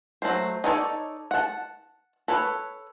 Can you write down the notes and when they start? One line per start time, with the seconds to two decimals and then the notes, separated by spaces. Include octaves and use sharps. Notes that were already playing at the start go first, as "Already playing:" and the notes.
0.22 F#3 A3 C5
0.64 D#4 A4 C#5 D5
1.31 F#5 A5
2.28 A4 B4 C#5